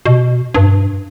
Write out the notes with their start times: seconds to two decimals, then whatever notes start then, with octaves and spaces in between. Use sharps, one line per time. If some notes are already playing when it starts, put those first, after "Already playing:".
0.06 B2
0.55 G2